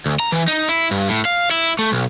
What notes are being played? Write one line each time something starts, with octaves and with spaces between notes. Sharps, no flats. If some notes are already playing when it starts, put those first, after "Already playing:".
D2
A#5
E3
D#4
E4
G2
A2
F5
E4
A3
B1